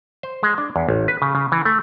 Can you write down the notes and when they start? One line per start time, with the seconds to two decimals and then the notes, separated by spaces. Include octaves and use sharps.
0.23 C5
0.43 G#3
0.58 D4
0.76 E2
0.89 A1
1.08 B4
1.22 C#3
1.35 C#3
1.52 E3
1.65 A3